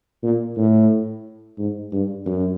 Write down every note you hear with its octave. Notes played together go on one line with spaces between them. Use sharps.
A#2
A2
G#2
G2
F#2